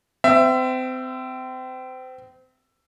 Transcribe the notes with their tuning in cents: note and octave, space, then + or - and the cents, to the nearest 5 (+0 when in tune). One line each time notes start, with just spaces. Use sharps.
C4 -30 E5 +20